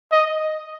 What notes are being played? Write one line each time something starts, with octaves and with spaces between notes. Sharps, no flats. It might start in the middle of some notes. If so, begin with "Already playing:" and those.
D#5